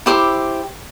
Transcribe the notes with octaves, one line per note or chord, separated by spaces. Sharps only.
E4 G4 C5 D6